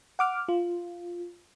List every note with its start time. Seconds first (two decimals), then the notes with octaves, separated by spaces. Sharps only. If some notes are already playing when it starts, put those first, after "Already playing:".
0.19 F#5 D6 F6
0.49 F4